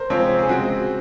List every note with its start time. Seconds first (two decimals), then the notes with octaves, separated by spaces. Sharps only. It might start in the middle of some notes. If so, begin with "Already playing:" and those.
Already playing: A#4 C5
0.10 C3 F3 G#3 C4 C#5
0.19 C5
0.39 G#4
0.48 C#3 G#3 C4 F#4